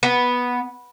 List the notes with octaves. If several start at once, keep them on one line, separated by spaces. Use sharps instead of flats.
B3